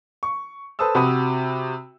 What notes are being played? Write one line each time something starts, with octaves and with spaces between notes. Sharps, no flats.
C#6
A4 B4 C5 A5 D#6 E6
C3 F#4 B5 D#6 D#7